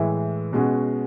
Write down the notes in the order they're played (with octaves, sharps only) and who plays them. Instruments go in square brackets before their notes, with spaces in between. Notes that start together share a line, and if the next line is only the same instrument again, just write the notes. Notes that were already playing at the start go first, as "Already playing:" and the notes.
Already playing: [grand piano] A2 E3 G#3
B2 G#3 C#4 F#4